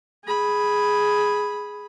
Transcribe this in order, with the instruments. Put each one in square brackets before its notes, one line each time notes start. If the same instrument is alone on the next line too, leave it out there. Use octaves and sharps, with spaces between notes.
[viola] G#4 B5